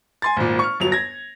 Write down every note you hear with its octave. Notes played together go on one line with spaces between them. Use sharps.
G#5 C6 A6
G#1 A#2
C#6 F6
G1 F#3 F7
G#6 A#6